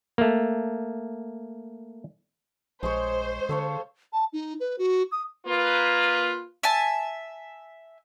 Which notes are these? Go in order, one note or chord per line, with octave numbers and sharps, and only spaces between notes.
A3 A#3
A#1 G#3 C5 C#5
D3 A4 C#5 F5
A5
D#4
B4
F#4
D#6
A#3 F4 B4
E5 G#5 A5